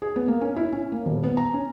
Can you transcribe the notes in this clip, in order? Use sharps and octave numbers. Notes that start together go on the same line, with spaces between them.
G#4
B3
A#3
C#4
E4
C#4
A#3
D#1
B3
A#5
C#4